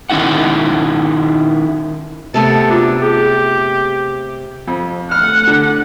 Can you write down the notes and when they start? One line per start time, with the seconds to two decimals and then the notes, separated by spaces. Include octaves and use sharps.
0.10 D#3 C#4 D#4 E4 F#5
2.34 C3 A3 B3 A4 A#4 A5 E6
2.70 D4 F4 F#4 A#5
3.02 G4 G#4
4.68 F2
5.11 A3 F#5 F6
5.47 D3